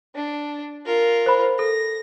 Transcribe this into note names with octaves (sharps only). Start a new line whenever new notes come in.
D4
F4 A#4
C5 B5
A4 A#6